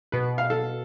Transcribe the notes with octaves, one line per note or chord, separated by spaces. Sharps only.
B2 B4
F5
A4